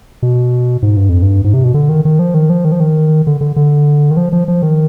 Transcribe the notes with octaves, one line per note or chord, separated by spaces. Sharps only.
B2
G#2
G2
F2
G2
G#2
C3
B2
D3
D#3
D#3
F3
D#3
F3
D#3
F3
D#3
D3
D3
D3
D#3
F3
F3
F3
D#3